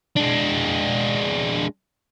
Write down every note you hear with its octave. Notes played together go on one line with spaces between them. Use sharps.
G#3 D4